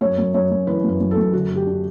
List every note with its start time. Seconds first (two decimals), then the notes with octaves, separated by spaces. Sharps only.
0.01 F#2 C#5
0.18 F#2
0.34 F#2 C#5
0.51 F#2
0.67 E3 B4
0.84 F#2
0.89 B4
1.00 F#2
1.11 A4
1.17 F#2
1.33 D3 F#4
1.50 D3
1.55 G4
1.66 D4